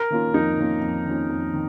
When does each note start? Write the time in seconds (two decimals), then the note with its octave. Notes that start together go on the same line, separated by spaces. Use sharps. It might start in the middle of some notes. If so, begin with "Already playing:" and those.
Already playing: A#4
0.10 D#3 A#3 C#4 F4
0.34 F2 D#4
0.58 D#3 A#3 C#4 F4
0.81 F2
1.06 D#3 A#3 C#4 F4
1.30 F2
1.54 D#3